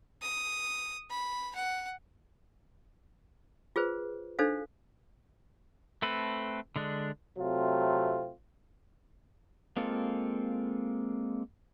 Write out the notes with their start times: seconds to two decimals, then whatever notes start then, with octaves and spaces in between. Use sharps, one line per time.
0.22 D#6
1.10 B5
1.55 F#5
3.76 F4 G#4 B4 C5
4.39 D4 D#4 A4 C5 F5
6.02 A3 C4 A4 B4
6.76 D3 G#3 D4
7.38 C3 F#3 A3 C4 F4
9.77 G#3 A#3 C4 F4 A4